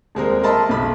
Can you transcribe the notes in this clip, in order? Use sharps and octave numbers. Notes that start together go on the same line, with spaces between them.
D#1 G#3 C4 A#4
A#4 D#5 E5 A5 B5 C6
B1 B5